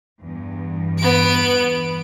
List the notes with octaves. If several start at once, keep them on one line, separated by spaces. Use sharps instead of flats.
E2 G2
B3 D7